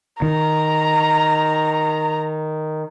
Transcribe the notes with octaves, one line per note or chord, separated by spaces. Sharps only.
D#3 A#5